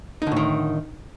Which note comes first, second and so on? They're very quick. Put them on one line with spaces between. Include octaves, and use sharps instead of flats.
D#4 D3 A2 D#3